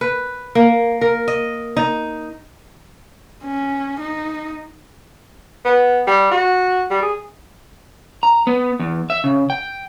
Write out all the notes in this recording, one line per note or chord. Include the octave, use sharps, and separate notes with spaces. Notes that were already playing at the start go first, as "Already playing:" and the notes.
B4
A#3
A#4
D#5
D#4
C#4
D#4
B3
G3
F#4
G3
G#4
A#5
B3
E2
E5
C#3
G5